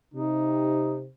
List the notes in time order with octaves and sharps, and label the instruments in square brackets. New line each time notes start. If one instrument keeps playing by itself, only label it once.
[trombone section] C3 [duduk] D#4